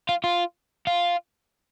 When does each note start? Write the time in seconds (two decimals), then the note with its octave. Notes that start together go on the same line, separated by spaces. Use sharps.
0.09 F4
0.24 F4
0.87 F4